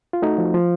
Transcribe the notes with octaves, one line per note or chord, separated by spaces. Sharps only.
F4
A3 D#4 F#4
F3
F3